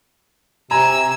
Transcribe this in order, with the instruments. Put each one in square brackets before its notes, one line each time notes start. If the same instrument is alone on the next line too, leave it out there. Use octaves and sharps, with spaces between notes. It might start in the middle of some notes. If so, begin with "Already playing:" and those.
[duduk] C3 [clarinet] G#5 [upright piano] A#5 [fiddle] E6